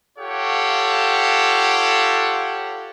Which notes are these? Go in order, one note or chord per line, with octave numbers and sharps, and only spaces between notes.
F4 G4 A4 C#5 F5 F#5